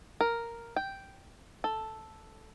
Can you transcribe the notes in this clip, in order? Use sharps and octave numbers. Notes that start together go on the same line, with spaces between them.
A#4
G5
A4